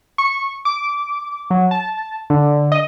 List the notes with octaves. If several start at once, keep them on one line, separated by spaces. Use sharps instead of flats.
C#6
D6
F#3
A5
D3
D#5